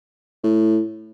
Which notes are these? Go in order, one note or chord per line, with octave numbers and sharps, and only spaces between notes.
A2